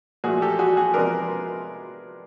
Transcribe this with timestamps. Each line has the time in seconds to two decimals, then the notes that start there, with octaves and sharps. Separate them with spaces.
0.24 A#2 F3 A3 F#4 G#4
0.42 G4 A4
0.59 F#4 G#4
0.77 F#4 G#4
0.94 C3 F3 G#3 B3 D4 G#4 A#4